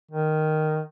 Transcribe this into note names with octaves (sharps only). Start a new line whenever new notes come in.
D#3